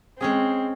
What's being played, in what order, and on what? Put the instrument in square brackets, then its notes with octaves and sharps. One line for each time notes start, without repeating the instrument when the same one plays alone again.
[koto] G#3 C#4 G#4 [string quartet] C4